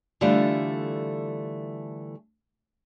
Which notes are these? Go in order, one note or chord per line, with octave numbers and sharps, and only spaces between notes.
D3 E3 G3 A3 F4